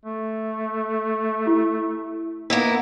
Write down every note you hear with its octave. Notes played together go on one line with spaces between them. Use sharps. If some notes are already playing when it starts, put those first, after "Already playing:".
A3
E4 G4
A#3 B3 E4 B4 D#5 G5